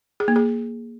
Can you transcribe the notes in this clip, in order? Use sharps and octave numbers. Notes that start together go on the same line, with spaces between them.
G#4
A#3
G#4